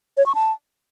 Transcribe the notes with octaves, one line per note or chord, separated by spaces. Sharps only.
C#5
C#6
A5